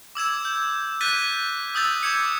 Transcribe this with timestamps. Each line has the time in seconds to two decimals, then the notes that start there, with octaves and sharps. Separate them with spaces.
0.15 D6 E6 G#6 E7
0.45 G6
1.01 F#6 G6 A6 B6 D#7
1.75 D#6 E6 G6 A6
2.03 D6 G#6 C#7